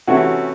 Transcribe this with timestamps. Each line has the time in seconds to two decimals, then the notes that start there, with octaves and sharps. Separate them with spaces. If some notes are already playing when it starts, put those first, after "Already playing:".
0.07 C3 E3 A3 C#4 F#4